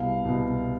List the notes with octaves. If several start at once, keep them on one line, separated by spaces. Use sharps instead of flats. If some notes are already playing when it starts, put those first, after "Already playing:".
Already playing: C2 B2 F5
C2 B2